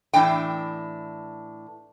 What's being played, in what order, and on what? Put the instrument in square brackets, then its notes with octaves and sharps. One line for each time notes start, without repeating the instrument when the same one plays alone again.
[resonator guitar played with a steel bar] A2 E3 D4 G5